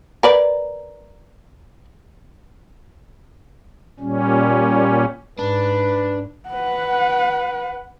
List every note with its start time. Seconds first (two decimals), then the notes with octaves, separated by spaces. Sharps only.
0.23 A#4 B4 D5
4.00 A#2 G3 C#4
5.39 G#2 D4 B4
6.49 B4 F#5